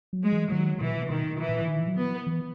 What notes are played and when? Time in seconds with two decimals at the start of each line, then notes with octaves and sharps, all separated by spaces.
0.13 F#3
0.23 G#3
0.33 E3
0.52 D#3 F#3
0.80 B2 E3
0.90 A#2
0.98 B2
1.10 B2 D#3
1.39 E3
1.49 A#2
1.62 E3
1.67 D#3
1.81 E3
1.87 F#3
1.97 B3
2.27 E3